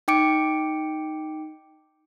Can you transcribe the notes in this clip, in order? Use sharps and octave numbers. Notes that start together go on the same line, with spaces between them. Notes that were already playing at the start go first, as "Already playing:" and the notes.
D#4 G5 D6 C#7 D7